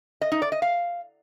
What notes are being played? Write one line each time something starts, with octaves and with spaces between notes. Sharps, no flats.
D#5
D#4
D5
D#5
F5